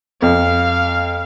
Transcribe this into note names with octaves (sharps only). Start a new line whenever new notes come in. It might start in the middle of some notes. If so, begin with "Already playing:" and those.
F2 F5